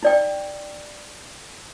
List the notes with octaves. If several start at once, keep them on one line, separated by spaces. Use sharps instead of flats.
D#4 D5 G5